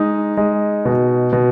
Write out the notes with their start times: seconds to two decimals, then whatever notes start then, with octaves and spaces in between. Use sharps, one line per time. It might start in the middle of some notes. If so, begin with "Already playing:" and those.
Already playing: G#3 D#4
0.37 G#3
0.85 B2
1.33 B2